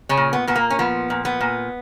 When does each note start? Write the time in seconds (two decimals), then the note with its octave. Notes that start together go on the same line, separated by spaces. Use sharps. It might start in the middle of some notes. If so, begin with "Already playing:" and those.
0.09 C#3 C#4
0.17 A#2
0.33 B3
0.47 A#2 B3
0.56 A#3
0.70 C#4
0.79 F3 B3
1.10 A#2
1.25 B3
1.41 A#2